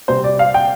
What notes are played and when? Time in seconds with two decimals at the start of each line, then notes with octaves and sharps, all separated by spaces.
0.08 C3 G3 C4 C5
0.24 D5
0.39 F5
0.54 G5